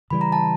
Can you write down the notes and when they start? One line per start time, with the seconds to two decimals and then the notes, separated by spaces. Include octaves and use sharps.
0.10 C#3 E3 G3 B5
0.21 A#5
0.32 A5